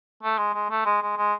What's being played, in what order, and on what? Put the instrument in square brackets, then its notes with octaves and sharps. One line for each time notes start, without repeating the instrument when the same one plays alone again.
[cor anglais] A3
G#3
G#3
A3
G#3
G#3
G#3